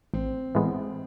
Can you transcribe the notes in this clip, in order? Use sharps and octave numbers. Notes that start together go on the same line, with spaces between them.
A1 C4
A2 E3 G#3 B3